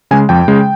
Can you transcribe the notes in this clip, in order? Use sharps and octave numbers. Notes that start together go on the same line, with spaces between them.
C#3 G#3 G#5
F2 G5
C#3 G#3